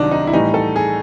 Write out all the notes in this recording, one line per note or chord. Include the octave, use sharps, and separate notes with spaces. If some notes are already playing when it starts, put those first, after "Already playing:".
Already playing: C2 C3 D#3 F#3 D4 D#4
D#4
E4
A2 E3 G3 D#4
A4
G#4